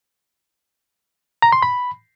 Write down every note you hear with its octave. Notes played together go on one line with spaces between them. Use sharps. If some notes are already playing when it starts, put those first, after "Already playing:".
A#5
C6
B5